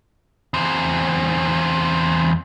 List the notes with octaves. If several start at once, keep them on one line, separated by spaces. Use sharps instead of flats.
E2 C4